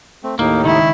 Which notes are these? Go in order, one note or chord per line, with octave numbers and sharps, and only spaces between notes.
A3 C4
D#2 A2 A#3 D#4
C#2 D#3 E4